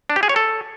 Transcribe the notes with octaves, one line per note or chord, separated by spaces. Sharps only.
D4
G4
G#4
C#5
A4